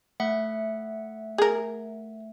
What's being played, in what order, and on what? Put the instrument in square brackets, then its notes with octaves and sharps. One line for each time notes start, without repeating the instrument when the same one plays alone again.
[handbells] A3 E5 F#5
[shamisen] G#4 A#4